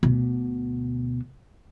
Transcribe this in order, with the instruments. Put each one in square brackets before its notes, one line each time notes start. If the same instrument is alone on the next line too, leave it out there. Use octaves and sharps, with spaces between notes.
[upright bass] D2 B2